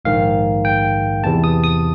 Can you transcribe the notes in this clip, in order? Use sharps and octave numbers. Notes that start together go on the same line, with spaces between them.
A#1 G#2 D#3 F5
G5
E2 C3 E3 A5
D#6
D#6